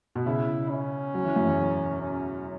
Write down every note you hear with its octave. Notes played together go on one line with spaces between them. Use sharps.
B2
C#3 E4
C#4
F#3
E3
F#2
E2
C#4